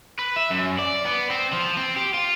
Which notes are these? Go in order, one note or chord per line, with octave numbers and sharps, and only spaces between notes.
B4
E5
F#2
D5
B3
C4
F3
C4
G4
F4